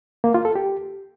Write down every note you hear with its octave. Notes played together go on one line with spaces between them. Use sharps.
A#3
F4
A4
G4